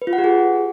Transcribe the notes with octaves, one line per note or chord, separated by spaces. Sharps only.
B4
F4
F#5
G4
G#4